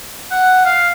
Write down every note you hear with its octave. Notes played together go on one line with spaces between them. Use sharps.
F#5
F5